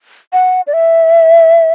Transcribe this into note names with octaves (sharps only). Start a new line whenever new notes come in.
F#5
D5
E5